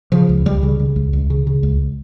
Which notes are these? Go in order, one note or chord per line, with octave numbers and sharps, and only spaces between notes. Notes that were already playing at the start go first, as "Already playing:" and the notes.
C#3 F3
C#2
C#2 G3
C#3
C#3
C#2
C#2
C#3
C#3
C#2